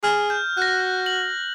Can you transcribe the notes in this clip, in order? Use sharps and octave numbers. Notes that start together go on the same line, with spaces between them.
G#4 F6
G6
F#4 F#6 A#6
F#7